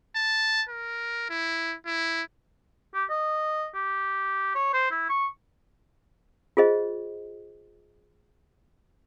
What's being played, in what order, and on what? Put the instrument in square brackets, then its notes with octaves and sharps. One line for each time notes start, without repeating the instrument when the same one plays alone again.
[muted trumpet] A5
A#4
E4
E4
[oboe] G4
D#5
G4
C#5
C5
E4
C#6
[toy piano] F4 G#4 C5 D#5